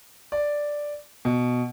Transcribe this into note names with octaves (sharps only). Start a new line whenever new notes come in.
D5
B2